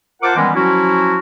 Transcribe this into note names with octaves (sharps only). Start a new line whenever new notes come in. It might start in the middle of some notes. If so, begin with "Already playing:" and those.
F4 A#4 C5 F#5 A5 D6
D#3 E3 G3 G#3 B3 C#4
F3 F#3 C#4 E4 F#4